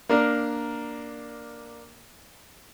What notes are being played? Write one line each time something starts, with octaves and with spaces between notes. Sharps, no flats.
A#3 D4 A#4